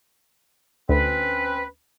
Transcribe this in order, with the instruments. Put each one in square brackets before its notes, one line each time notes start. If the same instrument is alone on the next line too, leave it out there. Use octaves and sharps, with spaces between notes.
[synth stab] D2 [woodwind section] C4 C#4 B4